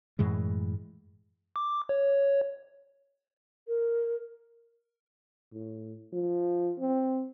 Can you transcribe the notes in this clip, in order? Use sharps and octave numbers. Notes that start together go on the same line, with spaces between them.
F#2 A2 E3 G#3
D6
C#5
A#4
A2
F3
C4